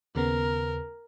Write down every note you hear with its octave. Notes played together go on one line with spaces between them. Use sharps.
D#2 C#3 B3 A#4